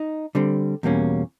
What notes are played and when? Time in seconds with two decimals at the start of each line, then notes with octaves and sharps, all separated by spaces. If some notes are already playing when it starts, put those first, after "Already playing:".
Already playing: D#4
0.35 D3 G3 C4
0.83 E2 B2 G3 A#3 C#4